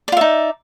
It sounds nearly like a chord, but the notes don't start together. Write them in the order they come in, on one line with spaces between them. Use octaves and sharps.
D5 F4 E5 D#4